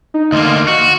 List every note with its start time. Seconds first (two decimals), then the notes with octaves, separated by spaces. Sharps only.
0.14 D#4
0.32 D2 A#3 D#5 C6 F6
0.68 F#4